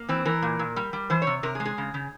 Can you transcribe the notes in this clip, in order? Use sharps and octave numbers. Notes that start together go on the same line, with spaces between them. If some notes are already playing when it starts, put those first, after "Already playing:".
Already playing: A#3
E3 C4
E3 A#4
A#2
A#2
G3
G3
E3 C5
C#5
C3
C3 A#4
G#4
G#3
G#4
C#3
C#3